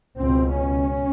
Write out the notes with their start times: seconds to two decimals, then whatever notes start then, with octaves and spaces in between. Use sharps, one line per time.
0.18 C#2 B2 C4
0.56 C#4